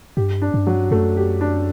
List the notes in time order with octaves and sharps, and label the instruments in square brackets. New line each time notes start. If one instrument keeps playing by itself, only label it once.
[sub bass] G2 [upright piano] G4
[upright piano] D4
[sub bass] G2
[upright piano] F#3
[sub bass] F#2 [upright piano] A3
[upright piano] G4
D4